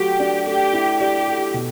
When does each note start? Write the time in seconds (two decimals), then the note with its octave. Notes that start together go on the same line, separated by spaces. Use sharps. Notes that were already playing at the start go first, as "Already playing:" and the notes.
Already playing: F#3 A3 F#4 G4
0.19 D4
0.47 A3 G4
0.73 E4
1.00 G4 D5
1.28 A4
1.54 B2